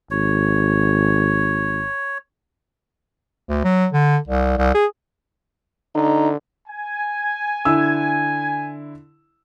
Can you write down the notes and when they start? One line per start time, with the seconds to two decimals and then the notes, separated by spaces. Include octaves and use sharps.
0.11 G#1 C#5
3.49 D2
3.64 F#3
3.92 D3
4.27 C2
4.57 C2
4.74 G#4
5.95 D3 D#4
6.69 G#5
7.65 D3 E4 E6